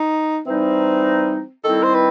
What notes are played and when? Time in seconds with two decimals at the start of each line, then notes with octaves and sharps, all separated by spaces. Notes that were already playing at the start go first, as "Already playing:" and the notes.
Already playing: D#4
0.46 E3 G3 C4 D#4
1.64 D#3 G3 C4 E4 A4
1.83 C5
1.95 B4